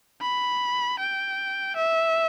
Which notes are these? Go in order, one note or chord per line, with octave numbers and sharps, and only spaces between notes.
B5
G5
E5